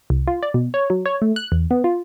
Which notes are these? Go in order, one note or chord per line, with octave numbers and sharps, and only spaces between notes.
C2
F4
D5
B2
C#5
F#3
C#5
A3
F#6
E2
B3
F4